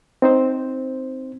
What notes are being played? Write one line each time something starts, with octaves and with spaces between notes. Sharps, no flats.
C4 D#4 C5